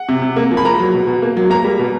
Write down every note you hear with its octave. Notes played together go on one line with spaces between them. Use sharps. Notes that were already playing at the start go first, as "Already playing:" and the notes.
Already playing: F#5
C3
C3
A#3
F3
B5
A#3 A#5
F#3
B2
B2
A#3
F#3
A#3 A#5
G3
B2